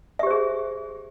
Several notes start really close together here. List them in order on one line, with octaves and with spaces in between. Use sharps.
E5 G4 C5 G#4